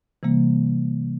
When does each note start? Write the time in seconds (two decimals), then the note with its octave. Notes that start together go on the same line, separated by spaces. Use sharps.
0.23 C3 E3 G3 A#3